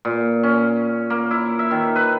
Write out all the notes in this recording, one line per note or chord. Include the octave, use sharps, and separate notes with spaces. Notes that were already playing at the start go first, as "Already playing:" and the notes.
A#2
C#4
A#3
E4
E5
D#3
B4